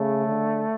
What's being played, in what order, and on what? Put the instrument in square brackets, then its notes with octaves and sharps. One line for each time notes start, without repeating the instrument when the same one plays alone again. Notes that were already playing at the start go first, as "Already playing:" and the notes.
Already playing: [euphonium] C#3 [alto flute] A3
[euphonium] D3